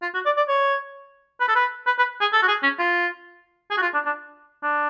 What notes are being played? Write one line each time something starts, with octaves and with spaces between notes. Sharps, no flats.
F4
F#4
D5
D5
C#5
B4
A4
B4
B4
B4
G#4
A4
F#4
G#4
C#4
F4
G#4
F#4
F4
D4
D4
D4